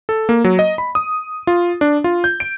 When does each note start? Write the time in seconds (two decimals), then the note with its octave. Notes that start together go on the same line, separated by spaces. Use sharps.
0.09 A4
0.29 A#3
0.44 F#3
0.59 D#5
0.78 B5
0.95 D#6
1.47 F4
1.81 D4
2.04 F4
2.24 G6
2.40 D7